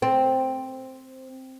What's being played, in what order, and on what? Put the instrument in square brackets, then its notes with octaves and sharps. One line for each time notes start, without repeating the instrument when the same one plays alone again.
[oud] C4